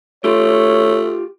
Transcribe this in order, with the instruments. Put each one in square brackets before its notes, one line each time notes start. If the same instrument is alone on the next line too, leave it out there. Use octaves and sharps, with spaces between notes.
[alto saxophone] A3 [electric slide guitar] F4 G4 [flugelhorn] C#5